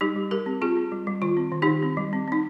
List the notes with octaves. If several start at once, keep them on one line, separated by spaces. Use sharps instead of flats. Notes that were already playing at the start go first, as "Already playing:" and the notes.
G3 D#4 G4
G3
G3 G4 A#4
C4
C4 F4 G#4
C4
G3
G3
D#3 F4
C4
D#3
D#3 D#4 G4
C4
G3
C4
C4 D#4